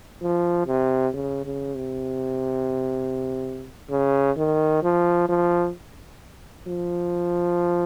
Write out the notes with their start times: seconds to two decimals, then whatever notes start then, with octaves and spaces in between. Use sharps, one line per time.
0.22 F3
0.67 C3
1.13 C#3
1.45 C#3
1.75 C3
3.90 C#3
4.36 D#3
4.83 F3
5.29 F3
6.67 F3